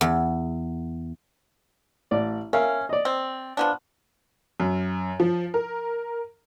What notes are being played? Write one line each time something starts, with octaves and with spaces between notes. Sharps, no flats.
E2
A1 D5
C#4 A#4 E5 F5
D5 D#5
C4
F3 B3 D4
F#2
F3
A#4